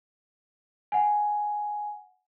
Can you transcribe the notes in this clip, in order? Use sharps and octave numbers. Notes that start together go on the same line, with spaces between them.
F#5 G#5